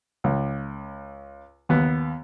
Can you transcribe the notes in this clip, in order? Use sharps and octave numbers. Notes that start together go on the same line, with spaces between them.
C#2
D#2 B3